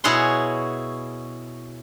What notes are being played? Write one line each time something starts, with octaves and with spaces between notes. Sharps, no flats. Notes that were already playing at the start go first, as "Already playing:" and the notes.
B2 E4 G#4 C#5 F#5 C6